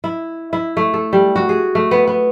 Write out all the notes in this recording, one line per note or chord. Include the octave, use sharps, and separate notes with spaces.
E4
E4
A3
A4
G3
F#4
G#4
A3
B3
B3